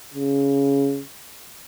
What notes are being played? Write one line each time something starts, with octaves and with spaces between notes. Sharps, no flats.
C#3